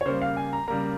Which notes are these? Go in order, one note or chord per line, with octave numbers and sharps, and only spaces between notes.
C#5
C#3 G3 A#3 C5
F5
G#5
A#5
C#3 G3 A#3 A#5